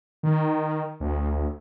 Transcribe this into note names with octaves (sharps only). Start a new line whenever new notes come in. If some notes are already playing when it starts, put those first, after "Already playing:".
D#3
D2